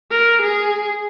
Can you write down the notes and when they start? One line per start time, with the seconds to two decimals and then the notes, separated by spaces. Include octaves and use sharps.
0.11 A#4
0.42 G#4